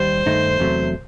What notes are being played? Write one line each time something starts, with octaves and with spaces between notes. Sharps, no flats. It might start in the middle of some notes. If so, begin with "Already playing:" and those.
Already playing: D#2 G3 C5
G2 D#3 A3 D#4
E2 C3 F#3 A3